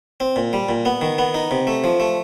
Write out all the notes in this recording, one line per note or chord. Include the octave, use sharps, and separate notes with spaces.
C4
A#2
G3
A#2
B3
D#3
B3
D#4
C3
A3
F3
A3